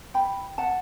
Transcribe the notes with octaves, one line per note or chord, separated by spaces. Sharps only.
G5 B5
F#5 A5